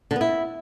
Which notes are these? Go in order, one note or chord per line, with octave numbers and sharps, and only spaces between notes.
D3
B3
E4